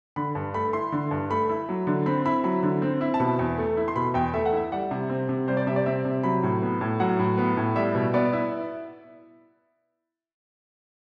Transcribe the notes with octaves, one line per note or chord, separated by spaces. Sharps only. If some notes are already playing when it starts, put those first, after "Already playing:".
D3 B5
G2
A3 B5
E4 C6
D3
G2
A3 B5
E4
F#3
D3
C4 B5
E4 B5
F#3 B5
D3
C4
E4
A5
B2 B5
E2
A3
E4
C6
B2 B5
E2 G5
A3 E5
F#5
E4 E5
G3 F#5
C3
C4
C3
G3 C5
D5
C3 E5
D5
C4 E5
C3
F#3 B5
A2
B3
A2
F#3 F#5
A2
B3
A2
G3 E5
B2
B3 D5
E4